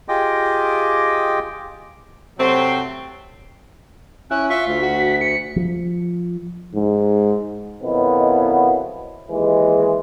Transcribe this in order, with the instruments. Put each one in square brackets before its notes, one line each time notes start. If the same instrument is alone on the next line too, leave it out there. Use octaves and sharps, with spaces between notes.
[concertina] F4 G4 G#4 D#5 G5 D6
[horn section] C3 F#3 A3 C4
[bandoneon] C#4 [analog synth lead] E4 [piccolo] F#6
[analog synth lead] F4 [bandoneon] E5 C#6 [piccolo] B6
[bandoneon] D2
[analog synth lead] F#4
C#7
[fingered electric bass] F3
[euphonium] G#2
[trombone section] F2 B2 D#3 F#3 B3 E4
D#2 E3 G#3